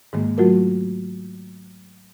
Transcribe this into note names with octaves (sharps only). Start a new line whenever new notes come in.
G#2 D#3 G#3 A#3
F#3 A3 F4 F#4 A#4